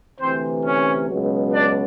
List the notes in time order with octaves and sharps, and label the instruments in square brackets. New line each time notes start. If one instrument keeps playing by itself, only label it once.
[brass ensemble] D2 C3 E3 C4 C5
C#4 C#5
C#2 B2 F#3
D4 D5